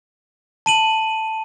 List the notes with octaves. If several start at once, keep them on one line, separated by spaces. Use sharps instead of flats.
A5 D#7 F#7